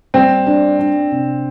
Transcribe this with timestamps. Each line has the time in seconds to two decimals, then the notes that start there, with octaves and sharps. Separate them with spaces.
0.14 G3 C4
0.46 D4
0.79 D4
1.12 C3